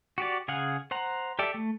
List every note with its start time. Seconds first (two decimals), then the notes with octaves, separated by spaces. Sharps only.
0.18 F#4 G4 D5
0.48 C#3 G#4 F5 F#5
0.91 C5 F#5 A#5
1.39 G4 A4 D5 E5
1.54 A3